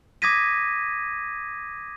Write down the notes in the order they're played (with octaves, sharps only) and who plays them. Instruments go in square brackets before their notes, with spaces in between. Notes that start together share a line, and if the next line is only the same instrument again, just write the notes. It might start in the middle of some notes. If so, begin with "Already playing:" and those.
[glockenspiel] D6 D#6 G#6 A#6 B6 D#7